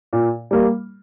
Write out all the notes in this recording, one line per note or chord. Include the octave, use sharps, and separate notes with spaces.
A#2
G3 A#3